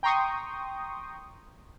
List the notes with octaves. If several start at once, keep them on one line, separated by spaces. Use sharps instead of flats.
G5 A#5 C6 C#6 D#6